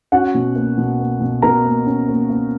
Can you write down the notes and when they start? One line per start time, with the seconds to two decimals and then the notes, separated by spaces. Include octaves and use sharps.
0.12 C#4 F#4 F#5
0.34 B2
0.56 A#3
0.78 B2
0.99 A#3
1.21 B2
1.42 B2 A#4 A#5
1.64 A#3
1.86 C#4
2.08 A#3
2.30 A#3